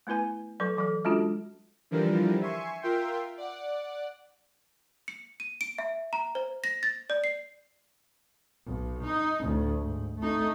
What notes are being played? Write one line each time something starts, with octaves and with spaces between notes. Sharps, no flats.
A3 B3 E4 B4 G#5
F#3 A4 B4 C#6
E3 F#3 A4
G#3 C#4 D4 F4 F#4 A4
D3 E3 F3 G3 A#4
E5 G#5 C6 C#6
F4 A#4 E5 G5 C6
D5 F#5
C#7
D#7
D7
E5
A#5
C5
A#6
A6
D5
C7
B1
D#4
D2 A2
G#2
A3 D#4